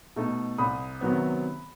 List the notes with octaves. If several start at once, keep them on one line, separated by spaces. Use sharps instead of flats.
B2 A3 D#4
C2 B5 D#6
C3 D#3 F#3 B3